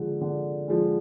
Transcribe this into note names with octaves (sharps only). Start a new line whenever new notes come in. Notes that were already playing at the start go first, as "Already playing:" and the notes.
Already playing: D3 F3 G#3
D3
F3 G#3